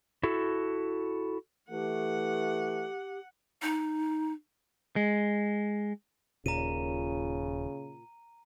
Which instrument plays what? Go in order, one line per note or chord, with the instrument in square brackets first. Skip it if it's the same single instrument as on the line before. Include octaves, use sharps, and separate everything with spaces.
[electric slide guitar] E4 F#4 A4
[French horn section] E3 A3 [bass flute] G4 [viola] F#5
[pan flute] D#4
[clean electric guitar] G#3
[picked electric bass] D#1 [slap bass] A#2 [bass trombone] C#3 [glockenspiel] A#5 D#7